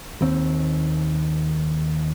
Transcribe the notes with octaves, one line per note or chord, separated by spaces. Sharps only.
D#2 C4